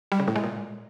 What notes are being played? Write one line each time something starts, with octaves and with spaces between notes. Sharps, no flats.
G3
C#3
A2
G#3
A#2